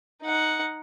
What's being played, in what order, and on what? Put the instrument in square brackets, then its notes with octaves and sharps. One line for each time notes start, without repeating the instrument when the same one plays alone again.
[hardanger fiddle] D#4 F#5